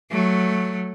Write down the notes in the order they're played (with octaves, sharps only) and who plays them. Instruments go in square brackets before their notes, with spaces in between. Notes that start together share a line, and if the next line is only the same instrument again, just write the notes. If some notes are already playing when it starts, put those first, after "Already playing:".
[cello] F#3 A3